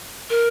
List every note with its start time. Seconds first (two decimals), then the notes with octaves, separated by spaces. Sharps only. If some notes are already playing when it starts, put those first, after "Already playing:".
0.30 A#4